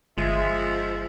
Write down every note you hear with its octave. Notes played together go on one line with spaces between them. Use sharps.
G1 F3 G#3 E5